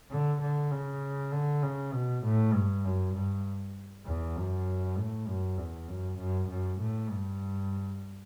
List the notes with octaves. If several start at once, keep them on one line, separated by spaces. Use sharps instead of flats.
D3
D3
C#3
D3
C#3
B2
A2
G2
F#2
G2
E2
F#2
A2
F#2
E2
F#2
F#2
F#2
A2
G2